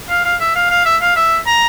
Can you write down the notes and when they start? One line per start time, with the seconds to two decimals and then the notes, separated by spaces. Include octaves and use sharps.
0.09 F5
0.24 F5
0.40 E5
0.55 F5
0.70 F5
0.86 E5
1.01 F5
1.16 E5
1.46 A#5